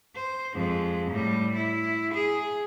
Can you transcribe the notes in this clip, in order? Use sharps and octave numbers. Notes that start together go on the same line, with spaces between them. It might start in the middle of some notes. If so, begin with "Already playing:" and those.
C5
F2 G#3
A2 G3
E4
G#4